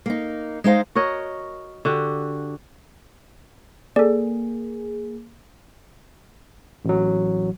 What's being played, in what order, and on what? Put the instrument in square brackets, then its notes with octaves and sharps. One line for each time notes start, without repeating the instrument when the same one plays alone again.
[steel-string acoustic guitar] A#3 D#4
G#3 D#4 C5 F5
[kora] F#4 A#4 C#5 D#5
D3 F#4 G4
[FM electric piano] A#3 G#4 [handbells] A4 D5
[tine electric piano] A1 F#3